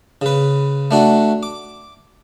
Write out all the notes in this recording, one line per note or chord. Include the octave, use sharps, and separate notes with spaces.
C#3 B4
A3 D4 F#4
D6